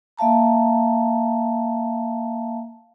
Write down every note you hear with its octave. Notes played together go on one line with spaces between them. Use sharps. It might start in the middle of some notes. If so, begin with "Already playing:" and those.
A#3 E5 F5 A5 A#5